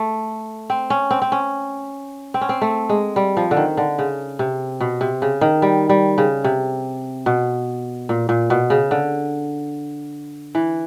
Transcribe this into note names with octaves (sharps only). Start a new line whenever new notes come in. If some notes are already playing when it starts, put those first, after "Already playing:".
Already playing: A3
C4
C#4
C4
C4
C#4
C4
C#4
C4
A3
G#3
G3
F3
D3
D#3
D3
C#3
C3
B2
C3
C#3
D#3
G3
G3
C#3
C3
B2
A#2
A#2
B2
C#3
D3
E3